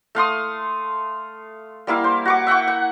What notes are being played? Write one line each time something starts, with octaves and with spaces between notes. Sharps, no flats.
A3 F5 C6 D#6
G3 A#3 E4 F5
C5
F#4 C#6 D6
E5 F#5 G5 C#6
F#5